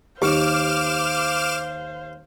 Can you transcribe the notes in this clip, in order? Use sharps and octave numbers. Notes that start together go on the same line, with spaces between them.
D#2 G4 C5 F5 D6 F6 E7